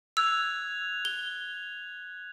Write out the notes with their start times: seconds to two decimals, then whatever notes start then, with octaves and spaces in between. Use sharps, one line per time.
0.17 E6 F#6 G#6 F7
1.05 G7